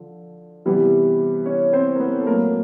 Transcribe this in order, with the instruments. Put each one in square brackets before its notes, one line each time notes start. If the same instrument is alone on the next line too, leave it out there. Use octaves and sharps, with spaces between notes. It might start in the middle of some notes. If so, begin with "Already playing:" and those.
Already playing: [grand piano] D3 F3
C3 E3 G3 B3
C#4 C#5
C4 C5
A#4
B3 B4
A4
A#2 F#3 A3 A#3 C#4 A#4